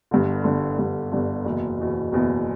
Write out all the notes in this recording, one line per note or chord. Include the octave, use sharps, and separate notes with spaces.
G1 G2 D3
G1 G2 D3
G1 G2 D3
G1 G2 D3
F#1 E2 B2
F#1 E2 B2
F#1 E2 B2